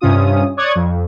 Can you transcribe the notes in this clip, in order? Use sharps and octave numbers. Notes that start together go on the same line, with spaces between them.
G2 C3 C#4 F4 D#6
C#5 D5 C#6 D#6 F#6 G#6
F2